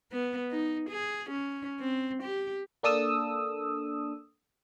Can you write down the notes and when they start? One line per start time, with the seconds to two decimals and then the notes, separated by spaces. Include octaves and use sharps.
0.12 B3
0.51 D#4
0.89 G#4
1.30 C#4
1.80 C4
2.23 G4
2.83 A#3 D4 A4 D#6 E6